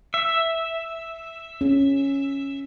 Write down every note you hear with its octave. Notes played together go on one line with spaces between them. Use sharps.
E5
C#4